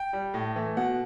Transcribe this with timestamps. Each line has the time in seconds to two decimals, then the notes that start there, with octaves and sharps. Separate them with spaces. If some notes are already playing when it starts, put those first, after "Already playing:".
Already playing: G5
0.13 G3
0.34 A2
0.56 E3 A3
0.77 B2 F#5